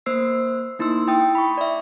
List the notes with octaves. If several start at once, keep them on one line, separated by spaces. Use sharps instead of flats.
A#3 C5 E6 C7
A#3 D#4 E4 C6 E6
E4 G5 D#6
B5 C#6
D5 E5